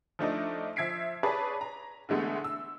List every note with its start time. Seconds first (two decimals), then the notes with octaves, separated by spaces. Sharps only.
0.19 F3 A3 D4 D#4
0.76 F3 E5 G#6 B6 C7 D7
1.23 G#4 B4 C#5 D5 A5
1.61 A#5
2.09 D3 E3 G#3 A3 B3
2.44 E6